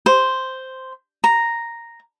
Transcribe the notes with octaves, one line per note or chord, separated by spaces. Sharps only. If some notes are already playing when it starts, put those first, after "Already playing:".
C5
A#5